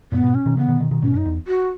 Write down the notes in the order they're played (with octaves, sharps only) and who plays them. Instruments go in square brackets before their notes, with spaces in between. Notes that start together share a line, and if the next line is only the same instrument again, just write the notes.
[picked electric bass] F#2 A#2 [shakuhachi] B3
[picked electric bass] G#2 B2
[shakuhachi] C#4
[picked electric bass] B2 D#3
[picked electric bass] C#3 E3 [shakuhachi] B3
[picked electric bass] B2 D#3
B2 D#3
B2 D#3
[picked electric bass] G#2 B2 [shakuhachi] C#4
[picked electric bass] F#2 [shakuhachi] D#4
[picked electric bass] E2
[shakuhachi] F#4